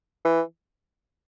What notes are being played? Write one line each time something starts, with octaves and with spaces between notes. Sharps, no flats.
E3